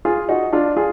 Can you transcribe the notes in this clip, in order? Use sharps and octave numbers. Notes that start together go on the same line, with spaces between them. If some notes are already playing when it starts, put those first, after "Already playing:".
F4 G#4
D#4 F#4
D4 F4
F4 G#4